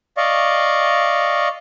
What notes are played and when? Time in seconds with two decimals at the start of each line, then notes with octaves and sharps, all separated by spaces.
0.17 D5 D#5 F5 C#6